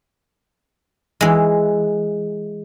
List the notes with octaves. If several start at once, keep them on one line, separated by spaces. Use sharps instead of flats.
E3 G#3